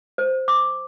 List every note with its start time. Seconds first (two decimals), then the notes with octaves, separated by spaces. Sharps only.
0.18 C5
0.48 D6